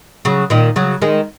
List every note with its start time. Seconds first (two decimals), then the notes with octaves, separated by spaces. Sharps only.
0.25 C#3 F#3
0.50 A#2 D#3
0.76 C#3 F#3
1.02 D#3 G#3